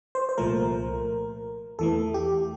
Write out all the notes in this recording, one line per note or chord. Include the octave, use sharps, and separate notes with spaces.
C5
C5
C2 A#2 F3 A3 A#4
E2 E3 A3 A4
G4